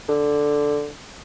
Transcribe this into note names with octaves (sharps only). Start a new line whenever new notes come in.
D3